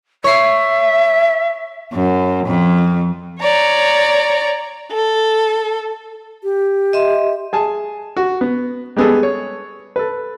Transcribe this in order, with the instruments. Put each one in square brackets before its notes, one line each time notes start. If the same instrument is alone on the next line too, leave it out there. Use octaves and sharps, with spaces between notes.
[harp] C#5 C7 [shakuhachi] E5
[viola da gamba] F#2
F2
[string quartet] C#5 D5 A#5
A4
[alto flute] G4
[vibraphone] D#5 E5 C6
[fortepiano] G#4 G#5 A5
F#4
B3
G3 G#3 B3 G#4 A4
C#5
A4 B4